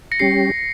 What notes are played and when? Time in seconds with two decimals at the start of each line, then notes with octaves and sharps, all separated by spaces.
0.11 A#6 C#7
0.19 G3 C#4 G4 C7